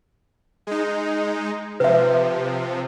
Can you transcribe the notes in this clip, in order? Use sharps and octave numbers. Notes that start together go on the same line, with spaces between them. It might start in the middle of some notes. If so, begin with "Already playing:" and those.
G#3 D#4
C3 F3 B4 E5